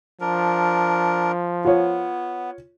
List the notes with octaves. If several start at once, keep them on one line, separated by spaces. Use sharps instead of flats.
F3 D4 A#4
B3 F4 C#5